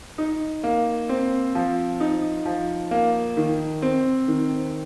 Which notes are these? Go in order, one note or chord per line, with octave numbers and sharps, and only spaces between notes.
D#4
A#3
C4
F3
D#4
F3
A#3
D#3
C4
D#3